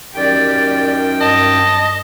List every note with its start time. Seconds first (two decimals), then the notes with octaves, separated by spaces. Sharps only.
0.15 F#2 D#3 G4 D5 G5
1.20 G2 D#5 A5